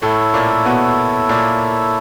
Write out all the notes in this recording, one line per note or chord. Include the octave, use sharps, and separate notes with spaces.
A2 A3 E4 A4 C#5
A#2 A#3
B2 B3
A#2 A#3